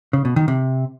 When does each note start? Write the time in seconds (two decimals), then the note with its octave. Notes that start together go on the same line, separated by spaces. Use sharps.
0.13 C#3
0.25 B2
0.36 D#3
0.48 C3